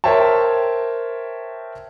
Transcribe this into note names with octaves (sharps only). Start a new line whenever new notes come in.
A#4 C5 C#5 E5 G5 A5